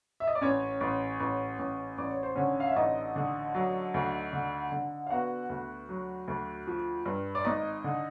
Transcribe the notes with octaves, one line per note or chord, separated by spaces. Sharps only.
E5
D#5
D5
A1 C#4 C#5
A1
A1
A1
A1 D5
C#5
C5
D3 C#4 C#5
F5
E5
A1 D#4 D#5
D3
F#3
D2
D3
D3
F5
B3 F#4 F#5
D2
F#3
D2
F3
G2
D5
G#1 D#4 D#5
D3